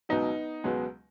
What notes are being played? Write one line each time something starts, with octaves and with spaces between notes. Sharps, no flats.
C#2 B2 F#3 B3 D#4
C#2 B2 F#3 G#3 B3